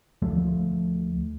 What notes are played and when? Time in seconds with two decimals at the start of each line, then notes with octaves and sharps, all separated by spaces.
0.22 D2 F3 A3